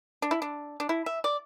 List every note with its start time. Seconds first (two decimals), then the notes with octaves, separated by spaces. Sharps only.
0.22 D4
0.31 E4
0.42 D4
0.80 D4
0.89 E4
1.06 E5
1.24 D5